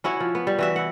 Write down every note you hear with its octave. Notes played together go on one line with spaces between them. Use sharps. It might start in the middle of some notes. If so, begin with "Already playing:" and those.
C#4 E4 F#4 C#5
F3
B3
G3
E3 F#4 E5
E4 F#5